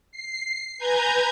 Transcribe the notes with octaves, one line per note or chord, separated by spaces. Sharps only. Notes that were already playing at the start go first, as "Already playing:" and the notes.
C7
B4 G#5 A#5 G6 G#6